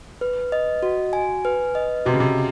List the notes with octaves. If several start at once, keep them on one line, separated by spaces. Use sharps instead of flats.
B4
D#5
F#4
G#5
B4
D#5
C3 F#4
C#3
C3